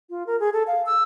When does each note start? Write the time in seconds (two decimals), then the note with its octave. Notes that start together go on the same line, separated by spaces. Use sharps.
0.10 F4
0.27 A#4
0.40 G#4
0.53 A4
0.67 F5
0.86 E6